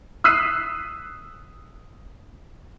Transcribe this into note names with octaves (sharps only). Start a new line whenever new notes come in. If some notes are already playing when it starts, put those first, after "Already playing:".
D#6 E6 F#6 B6 C7 D#7